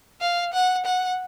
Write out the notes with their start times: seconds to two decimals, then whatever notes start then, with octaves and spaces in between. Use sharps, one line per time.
0.21 F5
0.54 F#5
0.86 F#5